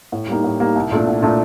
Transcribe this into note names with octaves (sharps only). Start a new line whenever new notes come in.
A2
G3 A#3 D#4
A2
G3 A#3 D#4
C2
A#2 A3 D4
C2
A#2 A3 D4